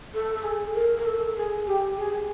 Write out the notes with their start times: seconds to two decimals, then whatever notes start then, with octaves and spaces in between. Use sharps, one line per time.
0.14 A4
0.34 A4
0.44 G#4
0.75 A#4
0.98 A#4
1.05 A4
1.36 G#4
1.66 G4
1.97 G#4